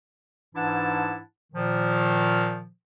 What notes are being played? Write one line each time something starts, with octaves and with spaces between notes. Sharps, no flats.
G#2 E3 D4 E4 F#5 A5
A#2 D#3 F3